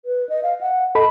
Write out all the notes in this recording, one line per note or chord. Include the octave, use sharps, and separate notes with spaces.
B4
D#5
F5
F#5
A4 D#5 B5